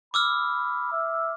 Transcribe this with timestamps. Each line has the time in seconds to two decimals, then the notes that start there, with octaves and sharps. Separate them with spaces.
0.14 B5 D6 E6 F6
0.92 E5